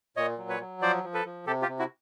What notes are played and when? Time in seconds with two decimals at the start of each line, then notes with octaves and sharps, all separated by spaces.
0.17 A#2 C#5 D#5
0.38 F#3
0.49 B4 C#5
0.60 F#3
0.81 F3 C5 D5
1.03 F3
1.14 A4 B4
1.25 F3
1.46 C3 G4 A4
1.62 F4 G4
1.68 C3
1.79 E4 F#4